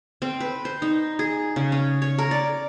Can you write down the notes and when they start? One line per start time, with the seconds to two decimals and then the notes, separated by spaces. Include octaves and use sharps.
0.22 C4
0.40 B4
0.65 C5
0.82 D#4
1.19 G#4
1.56 C#3
1.72 C#4
2.02 C#5
2.18 A#4
2.31 D5